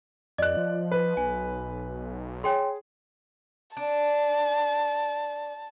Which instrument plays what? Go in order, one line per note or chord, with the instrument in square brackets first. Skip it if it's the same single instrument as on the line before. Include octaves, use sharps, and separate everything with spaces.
[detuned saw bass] F2 [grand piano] D5 F#6 [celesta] D#5
[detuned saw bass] F3
[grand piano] B4
[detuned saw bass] B1 [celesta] G#5
[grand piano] G#4 [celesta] C#5 G5 C6
[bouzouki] D4 [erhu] A5